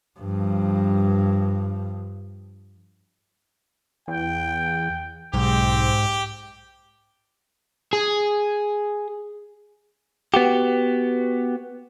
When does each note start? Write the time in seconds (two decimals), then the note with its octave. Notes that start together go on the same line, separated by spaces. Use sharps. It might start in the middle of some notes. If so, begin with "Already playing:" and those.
0.20 G2 F3
4.08 E2 G5
5.34 B1 G#2 C4 G4
7.93 G#4
10.34 B3 F#4 G4